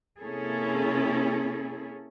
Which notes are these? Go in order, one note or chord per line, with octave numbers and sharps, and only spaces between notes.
C3 A#3 C#4 E4 G#4 A4